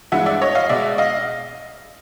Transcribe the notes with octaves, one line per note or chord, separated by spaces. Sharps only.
G2 E3 G#3 B3 E5 F#5
D5 E5
C#5 D#5
D#5 F5
B2 G#3 B3 D5 E5
D#5 F5